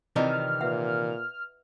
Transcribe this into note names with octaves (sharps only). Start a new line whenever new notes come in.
C3 D#3 E3 F4 D5 D#5 F6
A#2 B4 E5 F#5